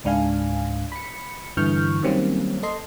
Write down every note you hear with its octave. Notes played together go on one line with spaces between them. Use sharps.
C#2 G#2 D4 F5 G#5
B5 C#7
G2 D3 E3 C#6 F6 G6
D#3 F#3 G3 A#3 C4 C#4
A4 D#5 C6